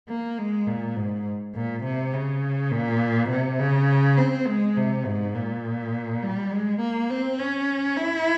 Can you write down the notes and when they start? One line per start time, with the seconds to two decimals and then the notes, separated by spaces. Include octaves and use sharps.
0.09 A#3
0.38 G#3
0.67 A#2
0.96 G#2
1.55 A#2
1.84 C3
2.13 C#3
2.72 A#2
3.30 C3
3.59 C#3
4.18 C4
4.47 G#3
4.77 C3
5.06 G#2
5.35 A#2
6.23 G3
6.51 G#3
6.81 A#3
7.10 C4
7.39 C#4
7.97 E4